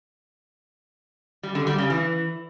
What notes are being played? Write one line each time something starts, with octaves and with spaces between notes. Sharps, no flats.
G3
D3
G3
C#3
E3